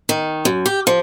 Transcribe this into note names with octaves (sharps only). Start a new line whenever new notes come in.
D#3
F#2
G4
F3